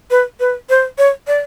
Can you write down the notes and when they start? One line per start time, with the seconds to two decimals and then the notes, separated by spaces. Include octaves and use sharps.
0.11 B4
0.40 B4
0.70 C5
0.98 C#5
1.27 D5